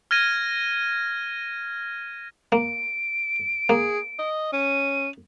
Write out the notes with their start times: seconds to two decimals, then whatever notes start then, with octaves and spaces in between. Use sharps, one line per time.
0.11 F6 G#6 A#6 D#7
2.52 A#3 D7
3.69 A#3 G#4
4.19 D#5
4.53 C#4 D#7